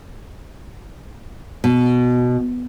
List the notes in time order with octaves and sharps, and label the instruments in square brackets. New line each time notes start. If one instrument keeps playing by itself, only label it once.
[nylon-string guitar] B2